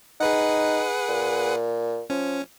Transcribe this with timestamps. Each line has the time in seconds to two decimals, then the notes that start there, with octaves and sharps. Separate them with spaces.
0.20 D#4 G#4 B4 F#5
1.09 A#2
2.10 F3 C#4